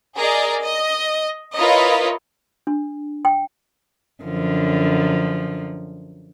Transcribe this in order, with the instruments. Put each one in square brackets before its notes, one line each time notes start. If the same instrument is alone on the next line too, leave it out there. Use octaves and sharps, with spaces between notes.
[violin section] G#4 A#4 D5 D#5
D#5
E4 F4 A#4 B4 C#5 D#5
[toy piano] D4
G5
[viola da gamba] F#2 D3 F3